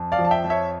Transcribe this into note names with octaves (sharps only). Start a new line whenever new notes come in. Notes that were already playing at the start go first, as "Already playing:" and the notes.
Already playing: F2
D5 F5
F3
A5
E5 G5
F2
C#5 E5